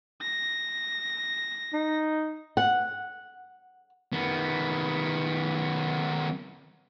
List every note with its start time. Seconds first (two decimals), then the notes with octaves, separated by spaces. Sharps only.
0.21 A#6
1.73 D#4
2.57 F#5
4.12 D#3 B3